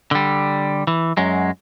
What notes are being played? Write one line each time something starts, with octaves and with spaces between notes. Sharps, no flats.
D3 G3
E3
F#2 F#3 G#3